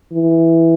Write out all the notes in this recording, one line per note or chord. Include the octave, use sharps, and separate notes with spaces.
E3